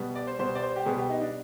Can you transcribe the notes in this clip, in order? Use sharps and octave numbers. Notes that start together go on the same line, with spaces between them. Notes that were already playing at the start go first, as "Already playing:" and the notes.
Already playing: B2 G3 B3
D5
C5
B2 G3 B3 C5
D5
C5
G4
B2 G3 B3 G#4
G4
D#4
D4